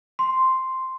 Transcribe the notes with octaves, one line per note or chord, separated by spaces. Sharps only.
C6